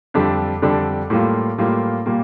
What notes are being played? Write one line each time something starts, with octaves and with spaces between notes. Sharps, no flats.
F2 D3 G3 D4
F2 D3 G3 D4
A2 G3 A#3 F4
A2 G3 A#3 F4
A#2 G3 A#3